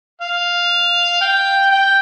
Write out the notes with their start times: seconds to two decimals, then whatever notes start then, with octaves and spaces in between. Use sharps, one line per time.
0.21 F5
1.21 G5
1.70 G5